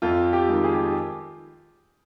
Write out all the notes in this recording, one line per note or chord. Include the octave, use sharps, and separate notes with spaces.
F2 F4
G4
D#3 G#3
G#4
G4
G#4